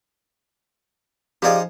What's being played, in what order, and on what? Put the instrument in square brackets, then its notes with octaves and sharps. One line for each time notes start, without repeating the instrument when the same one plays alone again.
[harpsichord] F3 D#4 G#4 [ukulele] G4 D5 F5